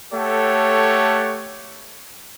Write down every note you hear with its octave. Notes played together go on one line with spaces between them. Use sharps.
A3 G4 A4 C#5 F#5